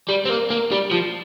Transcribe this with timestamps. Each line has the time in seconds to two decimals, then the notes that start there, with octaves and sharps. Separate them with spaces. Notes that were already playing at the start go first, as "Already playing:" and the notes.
0.09 G3
0.25 C4
0.30 A#3
0.50 A#3
0.71 G3
0.91 F3